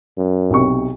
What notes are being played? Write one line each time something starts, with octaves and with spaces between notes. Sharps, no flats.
F#2
B1 C3 C#6